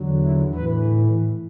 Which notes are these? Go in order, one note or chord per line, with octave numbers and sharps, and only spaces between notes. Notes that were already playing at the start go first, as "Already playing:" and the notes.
Already playing: E2 D3 F#3
E4
A2 E3 B4